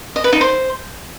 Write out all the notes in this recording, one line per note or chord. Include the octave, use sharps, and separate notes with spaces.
D#5
B4
D#4
C5